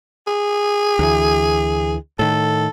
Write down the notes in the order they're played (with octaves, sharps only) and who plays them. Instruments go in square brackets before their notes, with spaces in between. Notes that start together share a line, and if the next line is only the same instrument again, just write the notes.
[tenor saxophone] G#4
[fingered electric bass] D2 E3
[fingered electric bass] A2 D#3 [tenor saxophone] A4